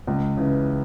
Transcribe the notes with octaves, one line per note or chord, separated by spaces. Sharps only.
C#2
C#3 E3